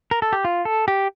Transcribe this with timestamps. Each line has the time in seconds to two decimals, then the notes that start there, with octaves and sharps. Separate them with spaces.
0.11 A#4
0.22 A4
0.33 G4
0.45 F4
0.65 A4
0.88 G4